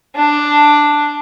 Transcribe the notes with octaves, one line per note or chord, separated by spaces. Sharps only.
D4